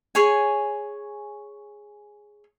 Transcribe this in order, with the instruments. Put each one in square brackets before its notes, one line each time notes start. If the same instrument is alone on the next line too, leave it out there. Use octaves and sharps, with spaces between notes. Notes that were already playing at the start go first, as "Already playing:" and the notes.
[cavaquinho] G#4 C#5 G#5